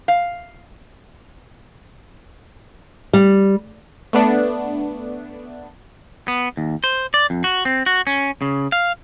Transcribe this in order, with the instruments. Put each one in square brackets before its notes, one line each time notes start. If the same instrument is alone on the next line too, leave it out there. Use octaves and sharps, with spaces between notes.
[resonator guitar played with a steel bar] F5
[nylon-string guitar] G3
[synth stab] A3 B3 D4
[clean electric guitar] B3
D#2
C5
D5
F2
F#4
C4
F#4
C#4
C#3
F5